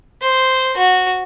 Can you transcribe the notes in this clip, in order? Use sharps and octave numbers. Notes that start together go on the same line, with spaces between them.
C5
F#4